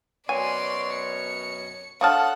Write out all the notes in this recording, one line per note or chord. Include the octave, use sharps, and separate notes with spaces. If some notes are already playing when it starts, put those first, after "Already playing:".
F#2 B2 C#5 D5 G#5 C6 D#7
C#7
D4 A4 C#5 F5 F#5 A5 D#6 F6